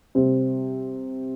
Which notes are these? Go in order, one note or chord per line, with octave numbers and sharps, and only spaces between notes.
C3 G3 C4